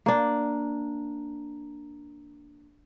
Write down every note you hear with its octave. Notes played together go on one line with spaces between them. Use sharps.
A#3 D4